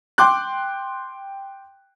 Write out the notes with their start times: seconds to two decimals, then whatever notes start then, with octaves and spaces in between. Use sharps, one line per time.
0.18 G5 C6 D6 F#6